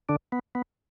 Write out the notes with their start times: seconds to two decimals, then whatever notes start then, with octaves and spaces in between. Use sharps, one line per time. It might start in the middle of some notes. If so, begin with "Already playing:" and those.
0.09 D3 D4
0.32 B3
0.55 B3